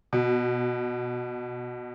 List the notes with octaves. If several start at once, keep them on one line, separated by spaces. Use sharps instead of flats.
B2